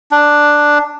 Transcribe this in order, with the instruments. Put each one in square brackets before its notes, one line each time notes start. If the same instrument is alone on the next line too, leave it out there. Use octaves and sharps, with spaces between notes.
[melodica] D4